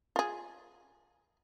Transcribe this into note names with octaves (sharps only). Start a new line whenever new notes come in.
F4 G#4